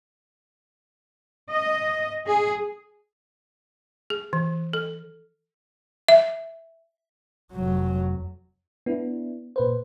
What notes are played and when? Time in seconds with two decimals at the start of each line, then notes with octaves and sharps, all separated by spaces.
1.50 D#5
2.27 G#4
4.10 G#4
4.33 E3
4.73 A4
6.08 E5
7.52 F1 F#3
8.86 B3 D4 E4
9.56 A#2 B4 C5